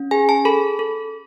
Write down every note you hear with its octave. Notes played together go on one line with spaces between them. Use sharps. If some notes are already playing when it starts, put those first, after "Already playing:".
Already playing: C#4
G#4 G#5
A5
A4 B5
A4